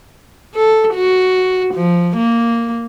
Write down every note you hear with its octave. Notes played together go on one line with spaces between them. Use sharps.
A4
F#4
F3
A#3